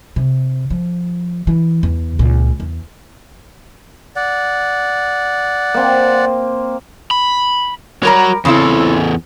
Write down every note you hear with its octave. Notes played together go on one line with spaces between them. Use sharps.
C3
F3
E3
E2
C#2 A#2
E2
D5 F#5
A#3 C4
B5
G3 F#4 A#4 C#5 A#5
E2 C#3 C4 E4 A4